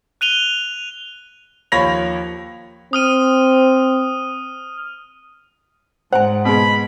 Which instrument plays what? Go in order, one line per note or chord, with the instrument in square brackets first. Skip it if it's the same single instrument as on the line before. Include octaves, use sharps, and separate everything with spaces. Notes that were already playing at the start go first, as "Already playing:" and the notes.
[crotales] F#6 D#7 F7 G7
[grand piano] D#2 F3 C#5 B5 A#6 F7
[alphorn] C4 [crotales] D#6 F6 D#7
[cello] G#2 [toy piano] C5 G#5 [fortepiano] F#5
[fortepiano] B2 G#3 [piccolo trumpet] B5